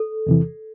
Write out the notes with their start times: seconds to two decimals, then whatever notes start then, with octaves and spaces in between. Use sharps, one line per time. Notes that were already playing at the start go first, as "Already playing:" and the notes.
Already playing: A4
0.27 E2 C3 E3